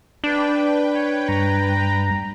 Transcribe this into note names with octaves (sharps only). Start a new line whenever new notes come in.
D4 B4 G5
C#5
G2 A#5